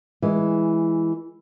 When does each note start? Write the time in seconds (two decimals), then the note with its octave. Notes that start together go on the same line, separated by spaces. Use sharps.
0.22 E3 G#3